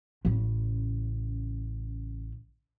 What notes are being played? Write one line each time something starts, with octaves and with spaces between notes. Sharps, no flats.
A1 C#3